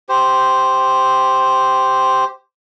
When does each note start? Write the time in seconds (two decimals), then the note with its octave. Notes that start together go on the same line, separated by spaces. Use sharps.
0.09 G4 C5